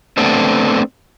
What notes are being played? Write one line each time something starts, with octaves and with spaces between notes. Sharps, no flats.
A3 B3 C4 D4